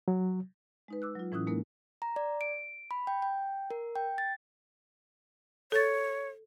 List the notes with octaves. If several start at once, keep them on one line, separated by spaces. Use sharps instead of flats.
F#3
G#3 D#4 B4
D6 E6 F#6
F#3 F4
A2 E3 C#4 E4 D#6 F#6
G#3 A#3 D#4 A#4
A#5
D5
D7
B5
G5
G5
A#4
G5
A6
A4 C#5 A6